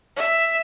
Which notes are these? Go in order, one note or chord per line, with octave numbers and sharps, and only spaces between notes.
E5